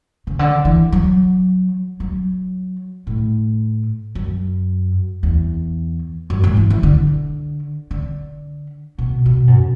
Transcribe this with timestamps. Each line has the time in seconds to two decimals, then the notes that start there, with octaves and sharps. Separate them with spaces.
0.27 C#3
0.39 D3
0.65 E3
0.92 F#3
2.00 F#3
3.07 A2
4.15 F#2
5.23 E2
6.30 F#2
6.44 G#2
6.57 E3
6.70 E3
6.83 D3
7.91 D3
8.98 B2
9.26 B2
9.47 F#2